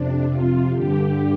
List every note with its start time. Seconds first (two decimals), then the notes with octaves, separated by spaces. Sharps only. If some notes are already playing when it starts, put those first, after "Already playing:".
Already playing: F2 C3 D4
0.29 F4
0.73 G2 D3 G4